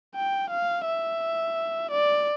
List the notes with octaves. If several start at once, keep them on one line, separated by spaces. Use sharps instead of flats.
G5
F5
E5
D5